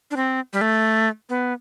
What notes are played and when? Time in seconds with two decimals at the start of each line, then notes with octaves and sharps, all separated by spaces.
0.11 D4
0.16 C4
0.53 G3
0.61 A3
1.29 B3